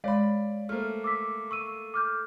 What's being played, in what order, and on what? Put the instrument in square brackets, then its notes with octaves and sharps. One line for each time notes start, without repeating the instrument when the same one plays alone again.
[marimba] G#3 [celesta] C#5 F5 [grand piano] D5 B5
[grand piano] A3 A#3 [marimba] C5 F6
[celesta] D6 E6 B6
C#6 E6 D#7
D6 F6 G6